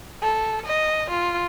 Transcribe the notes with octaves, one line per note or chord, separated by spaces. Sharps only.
A4
D#5
F4